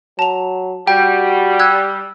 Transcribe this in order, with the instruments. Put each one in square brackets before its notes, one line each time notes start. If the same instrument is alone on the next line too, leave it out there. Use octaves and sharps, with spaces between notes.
[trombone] F#3 [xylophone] A5 F7
[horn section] G3 [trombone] F#4 [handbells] G5 [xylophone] G6
[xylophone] E6 F#6 G#6